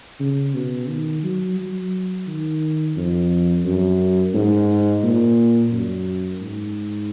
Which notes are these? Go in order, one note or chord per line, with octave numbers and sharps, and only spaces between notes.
C#3
B2
D#3
F#3
F#3
D#3
F2
F#2
G#2
A#2
F#2
G#2